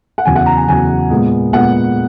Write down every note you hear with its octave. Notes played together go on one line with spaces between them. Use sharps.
F#5
E2 C#3 F#3 G#5
F#5
A#5
G#5
E2 C#3 F#3 G#5
A#2 G#3 B3
A#2 G#3 B3 F#5